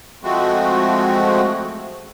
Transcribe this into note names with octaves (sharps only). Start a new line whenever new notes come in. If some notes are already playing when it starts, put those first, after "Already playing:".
F3 G#3 A3 C4 F#4